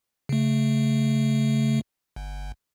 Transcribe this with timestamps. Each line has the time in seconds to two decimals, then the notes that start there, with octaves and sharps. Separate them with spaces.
0.29 C#3 A3
2.16 G1